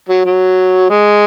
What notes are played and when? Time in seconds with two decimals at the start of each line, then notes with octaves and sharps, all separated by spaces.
0.09 F#3
0.25 F#3
0.90 G#3